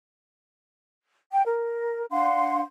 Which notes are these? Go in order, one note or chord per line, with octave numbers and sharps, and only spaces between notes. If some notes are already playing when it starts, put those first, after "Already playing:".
G5
A#4
D4 F5 F#5 C6